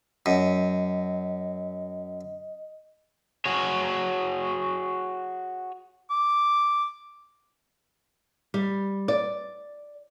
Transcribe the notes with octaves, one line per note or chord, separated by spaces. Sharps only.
F#2 D#5
F#4 G#4 C#5
D6
G3
D5